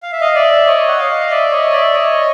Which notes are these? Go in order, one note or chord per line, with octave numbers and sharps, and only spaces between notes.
F5
E5
D#5 F5
D5 E5
C#5 D#5
F#5
D#5 F5
D5 E5
C#5 D#5
D5 E5
C#5 D#5